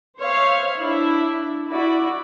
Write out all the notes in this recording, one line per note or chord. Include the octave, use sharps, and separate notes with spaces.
C5 C#5 E5 F5
D4 E4 E5
E4 F#4 D5